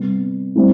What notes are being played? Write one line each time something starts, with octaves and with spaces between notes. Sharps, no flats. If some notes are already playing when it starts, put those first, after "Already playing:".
Already playing: C3 G3 B3
G3 C4 E4